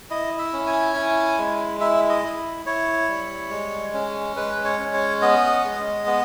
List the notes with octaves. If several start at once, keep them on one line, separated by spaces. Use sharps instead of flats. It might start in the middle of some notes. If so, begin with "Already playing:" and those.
E4 D#5
E5
C#4
G#5
E4
G#3
E4 E5
D#5
E4
E4 C#5
G3
G#3
C#4
G#3 B4
C#5
C#4
C#5
B3 D#5
G#3
B3